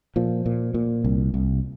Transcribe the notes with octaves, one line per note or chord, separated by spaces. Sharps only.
A#2 F3
A#2
A#2
C2
C2